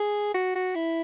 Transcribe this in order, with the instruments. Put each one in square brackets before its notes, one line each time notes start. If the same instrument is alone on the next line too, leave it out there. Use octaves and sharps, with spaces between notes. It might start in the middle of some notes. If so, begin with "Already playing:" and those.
Already playing: [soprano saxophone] G#4
F#4
F#4
E4